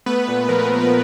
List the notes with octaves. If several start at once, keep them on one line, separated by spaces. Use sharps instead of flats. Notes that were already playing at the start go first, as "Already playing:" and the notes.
A3 B3 B4
A#2
F3 A#4
A3
B4